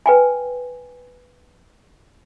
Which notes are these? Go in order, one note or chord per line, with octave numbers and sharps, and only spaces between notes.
B4 G5 G#5